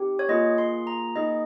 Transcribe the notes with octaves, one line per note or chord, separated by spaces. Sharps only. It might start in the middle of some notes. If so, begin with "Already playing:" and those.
Already playing: C4 D#4 G4
C#5
A#3 F4 G#4 D#5
C6
A#5
A#3 D#4 G#4 D#5